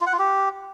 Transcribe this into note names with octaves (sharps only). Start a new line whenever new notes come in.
F4
F#5
F4
G4